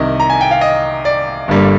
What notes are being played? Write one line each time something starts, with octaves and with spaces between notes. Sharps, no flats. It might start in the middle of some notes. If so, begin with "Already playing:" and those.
Already playing: C2 C3 D#3 D#5
A#5
G#5
G5
F5
D#5
D5
G1 G2 D3 G3 A#3